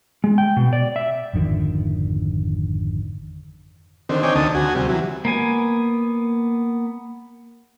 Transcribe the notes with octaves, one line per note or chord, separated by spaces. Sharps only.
G#3
G5
B2
D5
E5
G#1 F2 D3 D#3
D3 D#3 C4
C4 D#4 C#5 G5 G#5 D6
D2 D3 D#3 A5 D#6
D2 F#4 G#5
C3 G3
E3 F#3
A#3 B3 G#5